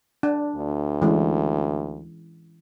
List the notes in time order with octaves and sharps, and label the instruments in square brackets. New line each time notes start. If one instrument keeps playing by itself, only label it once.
[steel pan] D4
[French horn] D2
[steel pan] E3 G#3 C#4